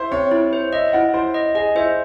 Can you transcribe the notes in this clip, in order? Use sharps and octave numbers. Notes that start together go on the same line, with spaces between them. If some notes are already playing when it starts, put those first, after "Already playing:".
Already playing: E4 C5
C4 C#5
E4
C5
D#5 E5
E4 F#5
E4 C5
D#5
G#4 D#5
E4 C5